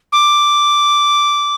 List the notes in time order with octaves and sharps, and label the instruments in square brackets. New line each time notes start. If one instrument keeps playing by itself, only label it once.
[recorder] D6